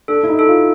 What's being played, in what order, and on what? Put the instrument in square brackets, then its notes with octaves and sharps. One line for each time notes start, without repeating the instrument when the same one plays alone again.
[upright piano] D4 [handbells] A4
[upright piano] E4
D#4
[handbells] A4
[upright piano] F4